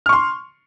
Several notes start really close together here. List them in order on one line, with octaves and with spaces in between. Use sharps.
F6 C#6 C6